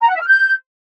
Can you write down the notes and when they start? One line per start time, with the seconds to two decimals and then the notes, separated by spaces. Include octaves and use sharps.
0.02 A#5
0.08 F#5
0.15 E5
0.21 F6
0.28 G6